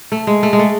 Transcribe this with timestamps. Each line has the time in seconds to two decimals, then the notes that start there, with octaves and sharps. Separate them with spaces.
0.12 A3
0.27 G#3
0.43 A3
0.53 G#3
0.59 A3